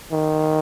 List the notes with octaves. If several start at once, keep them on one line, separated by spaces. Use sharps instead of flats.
D#3